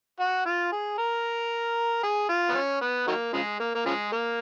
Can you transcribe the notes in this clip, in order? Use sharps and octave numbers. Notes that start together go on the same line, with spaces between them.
F#4
F4
G#4
A#4
G#4
F4
B3
C#4
B3
D#3 F#3 A#3
C#3 F3 G#3
A#3
A#3
C#3 F3 G#3
A#3